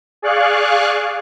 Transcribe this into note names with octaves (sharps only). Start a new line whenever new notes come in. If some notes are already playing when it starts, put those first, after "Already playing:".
G#4 D5 F5 C#6 F#6